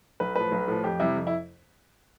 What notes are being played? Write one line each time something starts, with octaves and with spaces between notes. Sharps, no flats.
B1 B4
A2 F3 B4
B1
A2 F3
F2 G4
C3 G3 E4
F2
E4